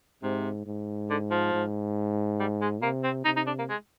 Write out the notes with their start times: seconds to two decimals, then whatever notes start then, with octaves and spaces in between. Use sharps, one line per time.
0.23 G#2 C3
0.66 G#2
1.10 D3
1.31 F3
1.53 G#2
2.40 G3
2.61 G#3
2.83 C3 A#3
3.04 C4
3.25 C3 D#4
3.36 D#4
3.47 D4
3.59 A#3
3.70 G#3